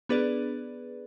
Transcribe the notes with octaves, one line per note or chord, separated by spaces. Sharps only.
B3 D4 G#4 B4 D5